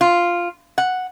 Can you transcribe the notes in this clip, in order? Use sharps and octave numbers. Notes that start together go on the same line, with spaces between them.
F4
F#5